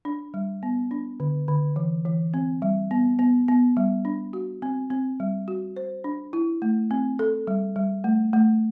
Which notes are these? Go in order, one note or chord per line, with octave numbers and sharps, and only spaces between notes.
D4
G3
B3
D4
D3
D3
E3
E3
C4
G3
B3
B3
B3
G3
D4
F#4
C4
C4
G3
F#4
C5
D4
E4
A3
C4
A4
G3
G3
A3
A3